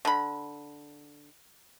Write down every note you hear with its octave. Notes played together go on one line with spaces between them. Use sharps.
D3 B5